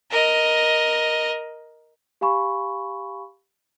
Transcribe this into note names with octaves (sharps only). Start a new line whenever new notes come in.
A#4 D#5
G4 F5 G#5 B5 C#6